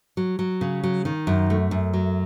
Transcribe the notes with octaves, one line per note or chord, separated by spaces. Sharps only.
F#3
F#3
C#3
F#3
D#3
F#2
A3
F#2
F#3